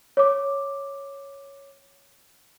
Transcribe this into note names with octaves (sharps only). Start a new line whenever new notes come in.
C#5 D6